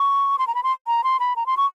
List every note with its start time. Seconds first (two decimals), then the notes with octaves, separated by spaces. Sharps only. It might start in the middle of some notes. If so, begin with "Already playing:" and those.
Already playing: C#6
0.39 C6
0.47 A#5
0.55 B5
0.63 C6
0.87 A#5
1.04 C6
1.20 B5
1.36 A#5
1.46 C6
1.57 C#6